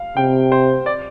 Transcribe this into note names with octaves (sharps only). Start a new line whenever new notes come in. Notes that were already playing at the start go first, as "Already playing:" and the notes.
Already playing: F5
C3 G5
C5
D5